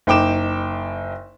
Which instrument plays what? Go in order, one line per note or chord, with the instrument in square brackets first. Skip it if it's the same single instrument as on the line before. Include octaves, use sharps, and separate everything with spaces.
[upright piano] F#1 D#4 G5 D6 E7